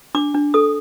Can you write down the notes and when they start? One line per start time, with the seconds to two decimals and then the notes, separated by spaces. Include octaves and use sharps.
0.15 D4 D6
0.34 D4
0.54 A4 D#6